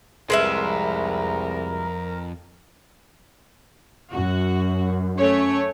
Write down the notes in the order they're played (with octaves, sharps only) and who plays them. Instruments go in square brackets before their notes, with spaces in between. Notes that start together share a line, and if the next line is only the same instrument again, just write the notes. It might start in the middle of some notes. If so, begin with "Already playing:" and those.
[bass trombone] C2 [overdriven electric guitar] F2 [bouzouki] G#3 B4 E5 [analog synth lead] A#4
[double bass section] F#2 [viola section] F#4
[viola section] A3 C#5 [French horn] C#4